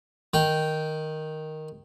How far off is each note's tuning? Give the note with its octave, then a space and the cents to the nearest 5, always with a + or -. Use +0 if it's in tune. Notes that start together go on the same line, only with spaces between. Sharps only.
D#3 +0 G5 -10